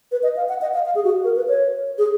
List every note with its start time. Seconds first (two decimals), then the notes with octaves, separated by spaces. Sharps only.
0.12 B4
0.23 D#5
0.37 F5
0.49 F#5
0.62 D#5
0.74 F5
0.86 F5
0.95 G#4
1.04 F#4
1.24 A#4
1.36 B4
1.48 C#5
1.98 G#4